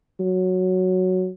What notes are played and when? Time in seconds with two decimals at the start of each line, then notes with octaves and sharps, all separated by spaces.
0.20 F#3